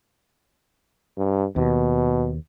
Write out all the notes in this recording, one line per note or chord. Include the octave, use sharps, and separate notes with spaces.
G2
D#2 B2